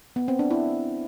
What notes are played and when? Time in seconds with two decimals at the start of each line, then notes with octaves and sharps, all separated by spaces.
0.16 B3
0.28 C4
0.39 D4
0.51 E4